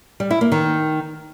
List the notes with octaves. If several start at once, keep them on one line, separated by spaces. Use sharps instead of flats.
G3
E4
A#3
D#3